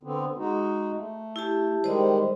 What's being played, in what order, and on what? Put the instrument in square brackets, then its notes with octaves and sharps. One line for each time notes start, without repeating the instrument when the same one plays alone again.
[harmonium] D3 B3 C4
G#3 D#4 F#4
A3
[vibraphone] E4 G4 A5
[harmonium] D#3 G3 G#3 [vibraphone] C5 D#5